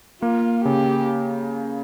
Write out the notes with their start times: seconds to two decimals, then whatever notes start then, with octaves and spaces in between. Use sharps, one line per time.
0.22 A#3 F4
0.64 C#3 G4